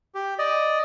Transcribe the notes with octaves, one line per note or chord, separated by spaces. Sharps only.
G4
D5 D#5